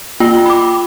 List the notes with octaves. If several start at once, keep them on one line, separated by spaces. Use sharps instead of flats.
A#3 F4 G5
B5 D6